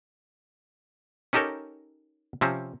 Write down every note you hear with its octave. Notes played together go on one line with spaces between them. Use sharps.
C#4 D#4 G4 A4 A#4 C#5
C3 F3 C4 C#4